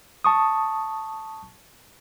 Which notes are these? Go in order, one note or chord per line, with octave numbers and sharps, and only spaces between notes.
A5 C#6 D#6